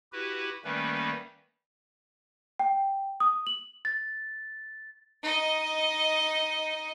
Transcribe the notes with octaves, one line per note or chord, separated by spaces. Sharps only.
E4 F#4 G4 B4
D#3 G3 A3 A#3 C#4 B4
G5
D#6
F#7
A6
D#4 D#5